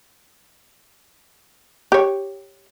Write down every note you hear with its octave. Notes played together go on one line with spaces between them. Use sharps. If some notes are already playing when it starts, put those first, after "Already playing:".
G4 C#5